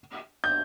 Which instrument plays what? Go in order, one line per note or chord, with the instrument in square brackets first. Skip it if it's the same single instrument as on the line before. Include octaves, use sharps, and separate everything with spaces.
[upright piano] G6